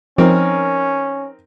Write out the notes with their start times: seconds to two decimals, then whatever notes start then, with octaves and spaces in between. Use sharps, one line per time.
0.18 F3 C4 C#4 D#4 A#4